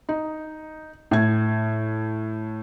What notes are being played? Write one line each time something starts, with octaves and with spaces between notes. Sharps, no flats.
D#4
A2 G#6